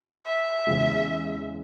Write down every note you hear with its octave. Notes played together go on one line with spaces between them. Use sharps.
E5
E2 C#3 G#3